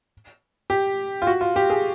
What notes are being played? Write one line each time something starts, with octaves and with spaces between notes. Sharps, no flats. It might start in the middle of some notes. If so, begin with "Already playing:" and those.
G4
F4
F#4
F4
G4
G#4